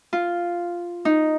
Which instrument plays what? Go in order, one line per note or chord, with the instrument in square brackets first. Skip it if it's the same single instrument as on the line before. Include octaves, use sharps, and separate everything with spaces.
[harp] F4
D#4